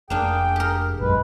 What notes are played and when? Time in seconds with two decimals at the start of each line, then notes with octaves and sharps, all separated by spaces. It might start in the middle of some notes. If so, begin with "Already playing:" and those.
0.10 F1 A#3 D4 G#4 G5
0.56 G4 A#4
1.00 A#1 F#2 G#3 B4